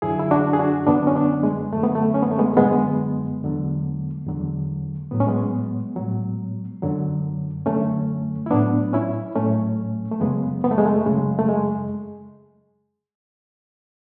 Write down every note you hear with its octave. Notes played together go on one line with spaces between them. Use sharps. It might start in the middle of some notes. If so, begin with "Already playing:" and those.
F#2 D3 F#3 E4 G#4
E4
D4 F#4
G#4
D4 F#4
F#2 D3 F#3 B3 D4
C#4
B3 D4
G#3
F#2 D3 F#3 A3
B3
A3
C#4
B3
A3
G#3 B3
F#2 D3 F#3 G#3 B3
E2 D3 F#3
E2 D3 F#3
A2 F#3 B3
C#4
G#3 B3
A2 F#3
F#2 D3 F#3
F#2 D3 F#3 A3 C#4
E4
A2 F#3 B3 D4
C#4 E4
A2 F#3 A3 C#4
A3
F#2 C#3 F#3 G#3 B3
B3
A3
G#3
A3
F#2 C#3 F#3 G#3
A3
G#3